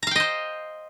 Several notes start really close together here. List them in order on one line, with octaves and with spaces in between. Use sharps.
A#5 F5 G5 D#5 C5